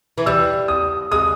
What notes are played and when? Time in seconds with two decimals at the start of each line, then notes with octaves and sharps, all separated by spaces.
0.18 E3
0.26 G3 E6
0.68 D#6
1.12 G#3 D#6